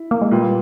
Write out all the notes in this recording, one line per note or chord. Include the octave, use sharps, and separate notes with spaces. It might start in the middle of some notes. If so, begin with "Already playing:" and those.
Already playing: E4
A#3
G#3
A#2 G3 B3